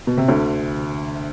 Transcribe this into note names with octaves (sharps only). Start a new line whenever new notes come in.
B2
C3
D2 D3